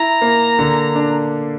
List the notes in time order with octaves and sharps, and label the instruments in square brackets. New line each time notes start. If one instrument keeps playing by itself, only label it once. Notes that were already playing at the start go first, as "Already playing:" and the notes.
Already playing: [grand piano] E4 [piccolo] A#5
[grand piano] A#3
D3
D4